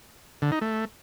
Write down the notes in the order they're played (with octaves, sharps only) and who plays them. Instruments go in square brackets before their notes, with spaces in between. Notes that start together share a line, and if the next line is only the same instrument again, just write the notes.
[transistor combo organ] D3
D#4
A3